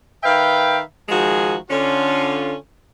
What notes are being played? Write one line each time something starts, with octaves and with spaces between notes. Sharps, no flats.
D#3 B4 E5 F5 G5
D#3 F3 G#3 F#4 G#4
D3 C#4 F4